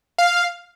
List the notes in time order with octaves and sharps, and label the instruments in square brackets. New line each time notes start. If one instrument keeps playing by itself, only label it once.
[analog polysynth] F5